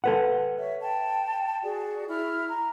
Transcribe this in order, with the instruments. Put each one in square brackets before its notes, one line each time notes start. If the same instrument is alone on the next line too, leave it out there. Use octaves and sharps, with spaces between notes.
[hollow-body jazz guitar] A4 B4 F#5
[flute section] C#5 E5
G5 A5
F#4 G#4 D5
E4 F6
A#5